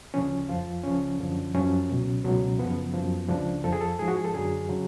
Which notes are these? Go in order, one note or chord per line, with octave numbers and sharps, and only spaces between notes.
D2 C#3 F3 C#4
F2 F3 F4
C#2 C#3 F3 C#4
F#2 D3 F3
F#2 F3 C#4
C#2 B2 F#3
C#2 B2 F#3
F#2 C#3 F3 B3
F#2 F3
C#2 C#3 F3 D4
F2 F3 A4
G#4
A4
G#2 F3 G#4
F#4
G#4
A4
F#2 D3 F#3 G#4
C#3 F#3